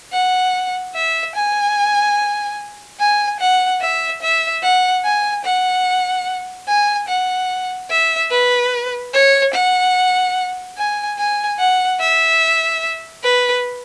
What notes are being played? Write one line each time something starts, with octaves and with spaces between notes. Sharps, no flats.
F#5
E5
G#5
G#5
F#5
E5
E5
F#5
G#5
F#5
G#5
F#5
E5
B4
C#5
F#5
G#5
G#5
F#5
E5
B4